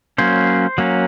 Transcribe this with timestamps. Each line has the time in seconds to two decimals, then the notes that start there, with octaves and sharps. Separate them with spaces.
0.18 F#3 A#3 C#4 C5
0.78 F#3 A#3 C#4